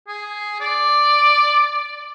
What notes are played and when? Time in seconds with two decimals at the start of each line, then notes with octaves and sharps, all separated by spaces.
0.08 G#4
0.61 D5